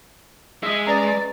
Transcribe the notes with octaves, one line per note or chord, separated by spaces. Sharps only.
G#3 D#5 E5
C#4 B4 D5 A#5